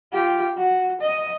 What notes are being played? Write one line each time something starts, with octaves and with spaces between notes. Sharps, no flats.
F4 G4
F#4
D#5